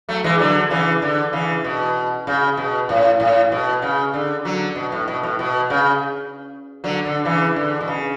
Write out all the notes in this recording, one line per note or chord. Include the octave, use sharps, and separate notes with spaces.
F#3 A3
E3 G#3
D3 F#3
C#3 E3
D3
C#3 E3
B2
C#3
B2
A2
A2
B2
C#3
D3
D3 F#3
B2
A2
B2
A2
B2
C#3
D3 F#3
D3
C#3 E3
D3
B2
C#3